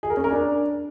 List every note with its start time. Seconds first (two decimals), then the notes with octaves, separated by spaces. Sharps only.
0.03 G#4
0.10 A#4
0.17 C#4
0.24 A#4
0.31 D4